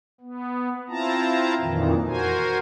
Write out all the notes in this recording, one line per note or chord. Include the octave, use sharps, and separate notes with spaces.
B3
C4 E4 F4 A5 A#5
F2 A#2 D#3 E3
F#4 A#4 C5 G#5